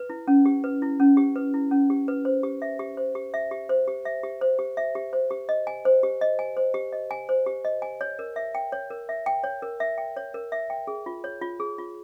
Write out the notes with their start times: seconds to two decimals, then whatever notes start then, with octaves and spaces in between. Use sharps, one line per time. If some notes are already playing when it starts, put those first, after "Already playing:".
Already playing: B4
0.10 E4
0.28 C#4
0.46 G4
0.64 B4
0.82 E4
1.00 C#4
1.17 G4
1.36 B4
1.54 E4
1.71 C#4
1.90 G4
2.08 B4
2.25 C5
2.43 G4
2.62 E5
2.79 G4
2.97 C5
3.15 G4
3.34 E5
3.51 G4
3.69 C5
3.88 G4
4.05 E5
4.23 G4
4.42 C5
4.59 G4
4.77 E5
4.95 G4
5.13 C5
5.31 G4
5.49 D#5
5.67 G#5
5.85 C5
6.03 G4
6.21 D#5
6.39 G#5
6.57 C5
6.74 G4
6.93 D#5
7.11 G#5
7.29 C5
7.46 G4
7.65 D#5
7.82 G#5
8.01 C#5
8.19 A#4
8.36 E5
8.55 G5
8.72 C#5
8.91 A#4
9.09 E5
9.26 G5
9.44 C#5
9.62 A#4
9.80 E5
9.98 G5
10.17 C#5
10.34 A#4
10.52 E5
10.70 G5
10.87 G#4
11.06 F4
11.24 C#5
11.42 F4
11.60 G#4
11.78 F4